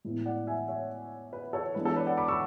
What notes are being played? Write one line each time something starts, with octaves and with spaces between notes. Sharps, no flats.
A2 G#3 B3 E4
D5 F#5
E5 G#5
C#5 E5
B4
A4 C#5
E3 G#3 B3 D4 B4
A4 C#5
B4 D5
D5 F#5
B5 D6
C#6 E6